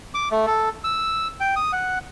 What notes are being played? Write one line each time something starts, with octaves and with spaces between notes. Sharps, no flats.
D6
A3
A4
E6
G5
D#6
F#5